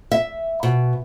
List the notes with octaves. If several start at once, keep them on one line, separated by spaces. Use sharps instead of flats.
E5
B2